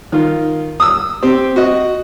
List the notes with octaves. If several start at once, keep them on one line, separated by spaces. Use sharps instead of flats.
D#3 F4
D#6 E6
C4 G4
F#4 D#5